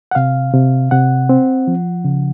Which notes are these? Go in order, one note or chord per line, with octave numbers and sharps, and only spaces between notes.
F#5
C3 F5
C3
C3 F#5
C4
F3
C#3